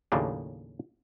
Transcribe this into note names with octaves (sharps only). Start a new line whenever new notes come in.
D#2 A2 C#3 F3 A#3 D4